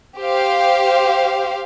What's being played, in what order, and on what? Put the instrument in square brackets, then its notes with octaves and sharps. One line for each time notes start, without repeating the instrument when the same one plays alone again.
[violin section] G4 C5 F5